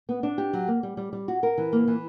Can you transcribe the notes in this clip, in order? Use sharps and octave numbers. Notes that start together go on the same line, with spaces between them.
B3
D4
G4
F#3
A#3
G3
G3
G3
F#4
A#4
E3
A#3
E3